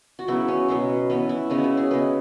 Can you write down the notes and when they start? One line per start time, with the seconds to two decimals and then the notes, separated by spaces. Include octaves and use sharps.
0.19 F#4
0.28 C#3 F#3 B3 E4
0.48 C#4
0.68 B2 F#3 B3
1.10 E3 B3 C#4
1.29 E4
1.50 C#3 G#3 B3 C#4
1.58 F#4
1.64 E4
1.77 G#4
1.91 C#3 G#3 B3 B4